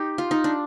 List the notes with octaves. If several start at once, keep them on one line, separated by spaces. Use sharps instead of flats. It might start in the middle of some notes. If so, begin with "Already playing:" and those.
Already playing: D#4 G4
F4
D#4
D4